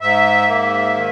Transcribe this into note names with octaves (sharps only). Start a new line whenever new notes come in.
G#2 E5
A#3
D#3